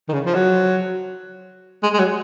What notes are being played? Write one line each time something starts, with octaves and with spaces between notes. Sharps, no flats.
D#3
C#3
F3
F#3
G#3
G#3
F#3